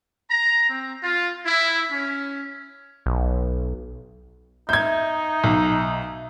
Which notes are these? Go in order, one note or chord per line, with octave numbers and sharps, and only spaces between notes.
A#5
C4
F4
E4
C#4
B1
D#4 E5 G6 G#6
B1